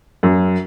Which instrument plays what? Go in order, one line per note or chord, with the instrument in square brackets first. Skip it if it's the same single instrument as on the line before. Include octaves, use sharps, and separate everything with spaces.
[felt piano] F#2